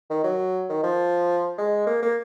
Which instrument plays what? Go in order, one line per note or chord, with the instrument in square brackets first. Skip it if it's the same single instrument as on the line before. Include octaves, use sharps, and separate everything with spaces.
[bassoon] D#3
F#3
D#3
F3
G#3
A#3
A#3